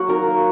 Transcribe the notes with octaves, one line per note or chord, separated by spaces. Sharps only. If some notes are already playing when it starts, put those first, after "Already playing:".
Already playing: F#3 A#3 F#4
D#4 A#4
A#3